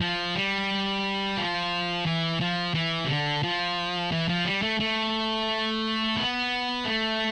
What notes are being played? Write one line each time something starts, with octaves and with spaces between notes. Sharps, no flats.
F3
G3
F3
E3
F3
E3
C3
D3
F3
E3
F3
G3
A3
A3
B3
A3